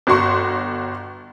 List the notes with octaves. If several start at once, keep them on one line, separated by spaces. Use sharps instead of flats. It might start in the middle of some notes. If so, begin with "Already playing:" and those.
G1 F#4 C6 C#6